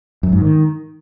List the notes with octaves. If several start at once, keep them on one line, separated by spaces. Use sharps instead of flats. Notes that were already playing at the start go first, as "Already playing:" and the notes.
F#2
G#2
D#3